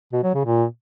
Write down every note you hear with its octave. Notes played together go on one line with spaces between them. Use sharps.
B2
F#3
C#3
A#2